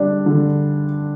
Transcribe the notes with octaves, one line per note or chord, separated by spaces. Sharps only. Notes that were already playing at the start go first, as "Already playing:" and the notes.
Already playing: D3 G3 D4
D3